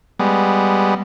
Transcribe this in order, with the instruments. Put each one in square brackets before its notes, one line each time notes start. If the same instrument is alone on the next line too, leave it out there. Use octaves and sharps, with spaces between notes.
[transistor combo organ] G3 G#3 B3